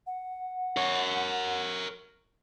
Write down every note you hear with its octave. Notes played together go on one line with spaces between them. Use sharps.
F#5
A#4 C#5